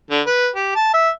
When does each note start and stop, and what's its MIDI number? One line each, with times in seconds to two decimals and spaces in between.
0.10 0.21 50
0.26 0.49 71
0.56 0.71 67
0.75 0.91 81
0.93 1.09 76